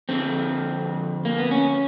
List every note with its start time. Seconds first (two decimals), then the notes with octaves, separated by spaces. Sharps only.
0.09 F2 D3 F3 C4
1.25 A#3
1.38 B3
1.51 C#4